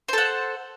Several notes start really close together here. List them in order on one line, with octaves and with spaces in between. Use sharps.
C5 A4 F#5